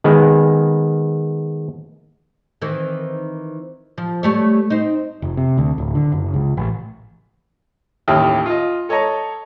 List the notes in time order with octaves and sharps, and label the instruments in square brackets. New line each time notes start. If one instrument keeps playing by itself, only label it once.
[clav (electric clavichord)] D#3 G#3 B3
[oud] D#3 E3 C4
F3
G3 A3 C#5
C4 D#4
[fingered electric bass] F1
C3
D2
D1
D3
F#1
C#2
A1
[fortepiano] A1 D#2 E4 G4 D#6 F6
F4 D#5
A4 C#5 D#5 A5 A#5